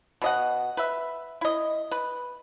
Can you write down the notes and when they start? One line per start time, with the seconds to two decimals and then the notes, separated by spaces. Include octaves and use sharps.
0.22 B2 D#5 F#5
0.77 B4 E5
1.41 E4 D#5
1.91 B4